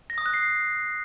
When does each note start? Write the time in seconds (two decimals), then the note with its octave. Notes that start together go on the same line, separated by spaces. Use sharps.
0.10 A#6
0.18 D#6
0.26 F#6
0.34 C7